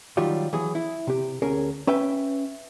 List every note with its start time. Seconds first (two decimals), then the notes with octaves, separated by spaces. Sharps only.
0.17 D#3 F#3 G3 F4 G4
0.53 E3 F#3 G#4
0.75 E4
1.07 C3 G4
1.42 D2 C#4 G#4 A#4
1.87 C#4 B4 E5 G5